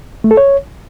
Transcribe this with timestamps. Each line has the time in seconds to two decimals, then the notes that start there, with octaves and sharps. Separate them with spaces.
0.24 A3
0.31 A4
0.37 C#5